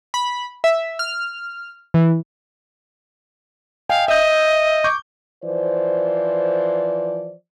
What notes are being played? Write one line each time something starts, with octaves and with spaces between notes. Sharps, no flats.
B5
E5
F6
E3
D#5 F5 G5 G#5
D#5 E5 G6
C#6 D6 G6
E3 F3 C5 D5